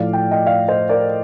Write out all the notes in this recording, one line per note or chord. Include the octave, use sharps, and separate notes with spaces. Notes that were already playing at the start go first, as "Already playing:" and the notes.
Already playing: A2 F3 D5 F5
G5
D#5 G5
D5 F5
C5 D#5
A#4 D5